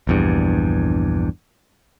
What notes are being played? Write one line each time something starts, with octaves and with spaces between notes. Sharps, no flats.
A#1 E2 G2